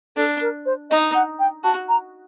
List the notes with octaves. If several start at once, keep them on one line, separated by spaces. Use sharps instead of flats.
D4 A4
A#4
C5
D#4 D#5
F#5
G5
F#4 A5
A#5